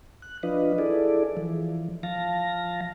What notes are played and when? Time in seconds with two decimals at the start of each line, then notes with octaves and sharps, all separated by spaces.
0.22 F#6
0.43 F3 D4 F4 B4 D#5
0.78 E4 G#4 A4 D5
1.37 E3 F3
2.03 F3 F5 A5 A#6